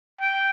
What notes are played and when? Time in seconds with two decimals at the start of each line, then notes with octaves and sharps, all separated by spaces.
0.20 G5